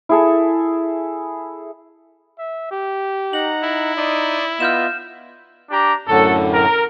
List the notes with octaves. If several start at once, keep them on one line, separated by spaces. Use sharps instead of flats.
E4 G#4 A4
E5
G4
D#4 F#5 A#5 F#7
E4
D#4 D5 C6 D#6
B3 F4 D#5 E5 F6 G6 E7
D4 G4 A#5
F#2 A2 D3 F#4 A4
A#4